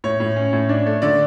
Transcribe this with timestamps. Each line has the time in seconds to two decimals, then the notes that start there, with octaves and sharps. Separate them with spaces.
0.04 A2 C#5
0.20 A2
0.36 C#4
0.53 A2
0.69 D4
0.86 A3
1.02 D3 D5